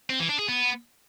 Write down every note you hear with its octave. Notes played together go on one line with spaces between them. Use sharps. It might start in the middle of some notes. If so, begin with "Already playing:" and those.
C4
E3
D4
G#4
B3